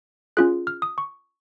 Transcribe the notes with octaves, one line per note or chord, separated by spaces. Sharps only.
C#4 F4 G#4 F#6
F6
D#6
C#6